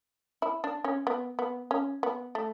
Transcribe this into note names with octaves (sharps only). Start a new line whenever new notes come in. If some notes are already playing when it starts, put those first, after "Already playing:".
E4
D4
C#4
B3
B3
C#4
B3
A3